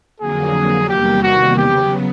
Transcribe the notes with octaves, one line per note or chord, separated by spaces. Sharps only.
F2 D3 F#3 A#3 G#4
E2 C3 D#3 G3 A#3 G4
F#4
C#3 F#3 B3 G4